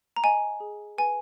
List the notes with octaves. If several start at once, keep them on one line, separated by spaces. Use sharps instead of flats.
A#5
D#5 G#5
G#4
B4 G#5